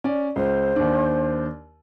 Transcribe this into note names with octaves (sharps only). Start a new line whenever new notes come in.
C#4 D5
C#2 C5
D#2 D4